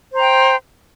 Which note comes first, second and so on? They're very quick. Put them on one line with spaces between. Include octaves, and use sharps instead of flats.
C5 A#5 G5